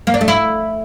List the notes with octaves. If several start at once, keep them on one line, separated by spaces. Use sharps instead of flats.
A#3
D4
A3
E4